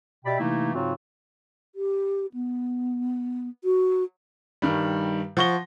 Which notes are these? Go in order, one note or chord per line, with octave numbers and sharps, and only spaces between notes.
B2 G4 D5 E5 G5 B5
C3 E3 A3 A#3 D#4 E4
G#2 C#3 F#3 C4 F4 F#4
G4
B3
F#4
G2 D#3 G3
F3 F#5 C#6 A#6 G7